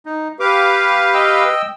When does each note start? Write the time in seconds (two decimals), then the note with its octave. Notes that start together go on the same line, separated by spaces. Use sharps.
0.06 D#4
0.40 G4 B4 F5 D6
1.14 D#5 G5 E6